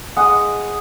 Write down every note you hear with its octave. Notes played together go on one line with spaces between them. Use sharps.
G#3 D#5 F#5